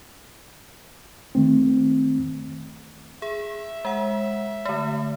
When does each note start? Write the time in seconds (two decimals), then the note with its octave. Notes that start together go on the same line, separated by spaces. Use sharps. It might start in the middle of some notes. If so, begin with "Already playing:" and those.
1.35 D#3 A3 C4
3.22 G#4 E5
3.85 G#3 F#5
4.65 D3 A3